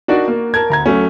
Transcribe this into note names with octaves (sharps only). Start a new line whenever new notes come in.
D4 D#4 F#4 A#4 D5
A#3
A#4 A5 G#6
D2 A#5 G#6
F#3 A3 C#4